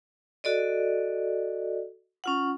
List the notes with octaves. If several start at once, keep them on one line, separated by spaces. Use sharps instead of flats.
F#4 A4 D5 D#5
C#4 F4 F#5